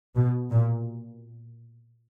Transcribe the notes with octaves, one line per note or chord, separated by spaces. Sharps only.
B2
A#2